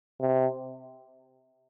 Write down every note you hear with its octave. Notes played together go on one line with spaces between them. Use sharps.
C3